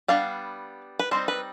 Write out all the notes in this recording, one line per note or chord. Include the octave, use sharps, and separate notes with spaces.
G3 B3 D4 F5
B4
G3 C4 D#4 C5
B4